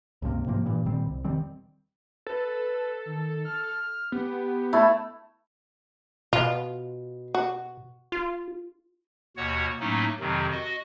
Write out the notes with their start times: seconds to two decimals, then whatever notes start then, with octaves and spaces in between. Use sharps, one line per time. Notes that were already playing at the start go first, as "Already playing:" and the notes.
0.22 C#2 G2 C3 A#3
0.46 G#2 C3 F3 A#3
0.66 G2 A#2 E3
0.86 A#2 D#3 G3 C4
1.06 C2
1.25 E1 D#3 G3 C4
2.27 A4 B4
3.06 D#3
3.45 F6
4.12 B3 G4
4.73 A3 E4
6.33 B2 F4
7.34 F#4
8.12 F4
9.37 D#2 B2 F#4 C#5 F#5
9.80 A2 F#3 A3 A#3 C#4 D#4
10.20 F2 C3 D#3 F#3
10.51 F#4 D#5